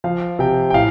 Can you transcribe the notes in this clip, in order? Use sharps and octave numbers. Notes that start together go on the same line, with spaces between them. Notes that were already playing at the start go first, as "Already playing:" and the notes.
F3 F5
C3 G5
G5
A2 F5